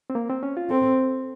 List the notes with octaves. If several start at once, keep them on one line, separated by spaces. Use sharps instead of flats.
C4
A#3
C4
C#4
F4
C4 A4